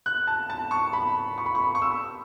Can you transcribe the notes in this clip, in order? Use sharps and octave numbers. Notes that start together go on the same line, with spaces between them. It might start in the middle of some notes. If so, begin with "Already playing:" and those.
F#6
A5
A5
C#6
B5
C#6
B5
C#6
C#6
E6